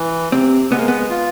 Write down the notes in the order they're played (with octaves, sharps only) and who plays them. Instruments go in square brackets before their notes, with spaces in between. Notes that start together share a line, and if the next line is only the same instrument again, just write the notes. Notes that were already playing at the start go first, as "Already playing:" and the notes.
Already playing: [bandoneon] E3
[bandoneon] C3 [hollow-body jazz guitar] C4
[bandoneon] G#3 [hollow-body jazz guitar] B3
[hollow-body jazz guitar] A#3
B3
[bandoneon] F4